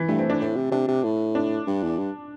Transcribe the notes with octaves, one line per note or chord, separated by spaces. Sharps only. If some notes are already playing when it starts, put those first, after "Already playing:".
Already playing: E3
G2 A3
C4
D4
A2 C4
C3
C3 D4
C3
A2
D4
G2
E2
G2